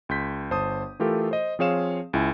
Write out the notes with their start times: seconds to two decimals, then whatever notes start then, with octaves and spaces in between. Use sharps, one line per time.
0.09 C#2 C6 G6 B6
0.51 G1 C5 A5 D#6
0.99 E3 A3 F4 G4 A4 A#4
1.31 C5 D#5
1.59 F3 C4 G#4 C#5 F5 E7
2.13 C#2 E4 G#5